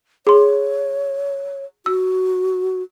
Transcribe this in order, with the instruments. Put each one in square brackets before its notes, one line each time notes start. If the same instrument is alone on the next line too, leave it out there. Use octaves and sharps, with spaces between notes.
[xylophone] G#4 C6 [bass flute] C#5
[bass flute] F#4 [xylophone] E6